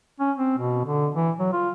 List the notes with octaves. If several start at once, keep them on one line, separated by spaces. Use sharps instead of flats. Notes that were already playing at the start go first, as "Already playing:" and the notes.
C#4
C4
B2
D3
E3
F#3
F4